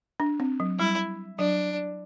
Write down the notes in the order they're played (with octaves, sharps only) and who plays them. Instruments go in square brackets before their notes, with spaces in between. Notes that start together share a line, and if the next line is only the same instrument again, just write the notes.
[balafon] D4
C4
F#3
[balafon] G3 [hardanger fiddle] E4
[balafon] F#3 [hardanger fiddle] D4